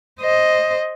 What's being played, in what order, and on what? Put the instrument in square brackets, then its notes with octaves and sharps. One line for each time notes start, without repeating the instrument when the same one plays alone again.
[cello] C5 D#5